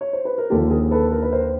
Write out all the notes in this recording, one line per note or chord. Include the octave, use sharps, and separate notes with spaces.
C#5
C5
B4
A#4
D#2 D3 F3 A#3 G4 A4
G#4 A#4
A4 B4
A#4
B4
A#4 C5